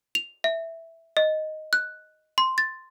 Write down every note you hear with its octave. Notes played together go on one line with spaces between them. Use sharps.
F7
E5
D#5
F#6
C6
A6